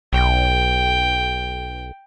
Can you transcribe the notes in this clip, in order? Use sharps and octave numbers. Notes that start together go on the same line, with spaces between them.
B1 G5